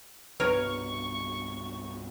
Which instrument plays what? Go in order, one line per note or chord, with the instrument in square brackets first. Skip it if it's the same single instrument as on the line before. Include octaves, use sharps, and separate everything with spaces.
[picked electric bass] C2 G2 B2 [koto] A#4 C#5 [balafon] B4 [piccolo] C#6